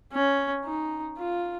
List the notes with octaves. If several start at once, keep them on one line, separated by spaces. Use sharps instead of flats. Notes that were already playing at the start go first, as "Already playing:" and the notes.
C#4
D#4
F4